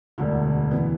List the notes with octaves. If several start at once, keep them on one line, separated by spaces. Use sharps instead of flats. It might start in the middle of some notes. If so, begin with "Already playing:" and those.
E1 D2 D3
E3 B3